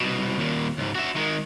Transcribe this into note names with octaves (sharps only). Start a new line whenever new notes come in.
C2 B2
D#2 A#2
C#2 G#2
F#4 E5
D#3 G#3